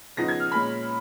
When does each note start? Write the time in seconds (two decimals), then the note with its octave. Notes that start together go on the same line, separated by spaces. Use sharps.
0.17 C#3 F3 B3 D#4 A#6
0.28 G#6
0.40 F6
0.51 A#2 G#3 C#4 B5